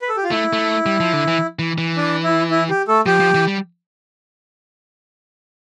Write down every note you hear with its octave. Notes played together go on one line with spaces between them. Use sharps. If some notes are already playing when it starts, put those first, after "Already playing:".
B4
A4
G4
F4
A3 E4
A3
G3
F3
D3
E3
E3
E3
D4
E4
E4
G4
A3 A4
F3 G4
F3
E3
G3